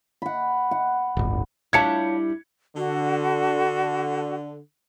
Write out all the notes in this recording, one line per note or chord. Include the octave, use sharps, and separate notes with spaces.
F#5 B5
F#5
D1 G1
G3 D4 E4 F4 C#5 A5 G#6 C#7
D3 F#4